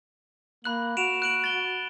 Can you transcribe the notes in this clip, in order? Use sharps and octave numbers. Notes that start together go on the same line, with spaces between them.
A#3 B5 F#6 F#7
F#4 D7 E7 F7
F#6 D7 F#7
A6 G7